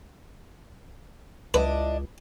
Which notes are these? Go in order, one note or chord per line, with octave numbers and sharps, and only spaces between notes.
C#2 D4 E4 B4 D#5